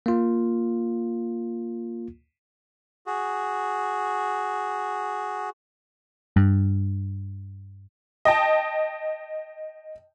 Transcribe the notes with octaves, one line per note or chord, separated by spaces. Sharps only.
A#3 F4
F#4 G#4
G2
D#5 G5 A5